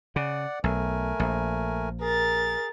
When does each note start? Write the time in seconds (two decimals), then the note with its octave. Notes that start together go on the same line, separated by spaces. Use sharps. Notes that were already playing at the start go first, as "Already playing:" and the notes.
0.16 C#3 D5 F#5
0.64 B1 A3 A#4 G#5
1.20 A#1
2.01 G#4 A#4 A6